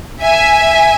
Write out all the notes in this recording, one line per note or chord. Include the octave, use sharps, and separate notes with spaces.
E5 G#5